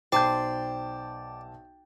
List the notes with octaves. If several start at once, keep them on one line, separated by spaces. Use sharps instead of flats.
B1 C5 D5 G5 A5 G6